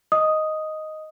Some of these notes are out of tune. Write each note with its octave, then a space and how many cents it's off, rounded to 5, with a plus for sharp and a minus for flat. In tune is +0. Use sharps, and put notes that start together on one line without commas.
D#5 +0 D#6 +0